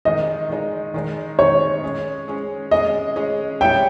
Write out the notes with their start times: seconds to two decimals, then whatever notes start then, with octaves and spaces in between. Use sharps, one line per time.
0.05 D#3 G#3 D#4 D#5
0.49 D#3 G#3 D#4
0.94 D#3 G#3 D#4
1.39 D#3 G#3 D#4 C#5
1.83 G#3 C#4 G#4
2.28 G#3 C#4 G#4
2.71 G#3 C#4 G#4 D#5
3.16 G#3 C#4 G#4
3.61 G3 C#4 G#4 C#5 E5 G5